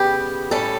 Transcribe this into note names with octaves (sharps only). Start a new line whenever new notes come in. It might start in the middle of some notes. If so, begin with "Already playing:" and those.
Already playing: C#3 G3 B3 G4
A2 G3 C#4 A4